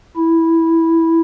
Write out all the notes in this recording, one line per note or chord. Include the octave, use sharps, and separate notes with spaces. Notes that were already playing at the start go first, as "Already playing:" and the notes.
E4